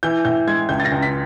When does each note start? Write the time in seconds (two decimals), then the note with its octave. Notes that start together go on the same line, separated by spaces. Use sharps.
0.03 E3 G6
0.25 A2 G6
0.47 G#3 G#6
0.69 C#2 G6
0.80 A6
0.85 A#6
0.92 C#2
1.02 B6